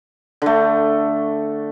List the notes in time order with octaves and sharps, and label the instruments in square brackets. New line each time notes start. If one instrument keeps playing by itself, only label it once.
[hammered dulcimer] D3 A3